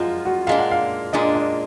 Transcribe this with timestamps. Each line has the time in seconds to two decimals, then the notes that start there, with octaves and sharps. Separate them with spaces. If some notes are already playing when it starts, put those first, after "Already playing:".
Already playing: F#2 F3 G#3 F4
0.25 F#4
0.47 A#2 G#3 D4 F5
0.59 F#5
0.71 F5
1.13 A#2 G#3 D4 D#5
1.35 D#5